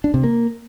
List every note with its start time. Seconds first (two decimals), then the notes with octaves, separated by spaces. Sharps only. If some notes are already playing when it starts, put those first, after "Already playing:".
0.04 D4
0.14 C3
0.24 A#3